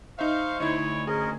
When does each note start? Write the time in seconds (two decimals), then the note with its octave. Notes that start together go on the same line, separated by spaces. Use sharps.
0.19 D#4 C5 E5 F5 C#6
0.60 D2 D#4 E4 C#5
1.07 C#4 G#4 A#4 D#5